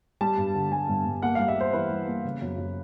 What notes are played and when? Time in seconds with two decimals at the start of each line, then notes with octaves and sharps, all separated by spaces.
0.21 G3 A5
0.38 G2
0.55 D3
0.72 G3 G#5
0.89 G2
1.06 G2
1.22 A#3 F#5
1.35 F5
1.40 G3
1.48 E5
1.56 G3 C5
1.73 E3 B4
1.90 G3
2.08 A#3
2.25 C#3
2.42 F#2
2.58 F#2